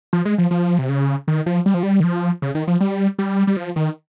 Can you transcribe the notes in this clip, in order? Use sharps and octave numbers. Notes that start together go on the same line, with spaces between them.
F3
G#3
F3
F3
C3
C#3
D#3
F3
G3
F3
G3
D#3
F3
C#3
D#3
F3
G3
G3
G3
F3
D#3